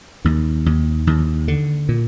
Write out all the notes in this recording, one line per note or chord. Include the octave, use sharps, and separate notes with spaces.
D#2 D#3
D#2
D#2
D3
A#2